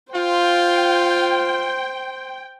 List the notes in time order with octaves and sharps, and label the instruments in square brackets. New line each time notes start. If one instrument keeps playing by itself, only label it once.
[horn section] F4 [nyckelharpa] C5 [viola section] G5